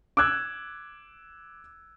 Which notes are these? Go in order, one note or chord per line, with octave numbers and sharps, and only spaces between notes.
D6 E6 F#6 G#6